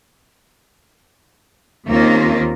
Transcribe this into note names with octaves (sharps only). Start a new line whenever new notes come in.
D#2 D#3 A#3 C4 C#4 F4